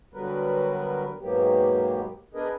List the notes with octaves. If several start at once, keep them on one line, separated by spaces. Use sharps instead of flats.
D3 F#3 G3 B3 A#4 B4
G#2 B2 F#3 A#3 B3 G4
B3 D4 G#4 A#4 B4 D#5